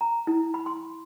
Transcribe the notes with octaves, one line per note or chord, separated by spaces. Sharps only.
A#5
E4
B5
C6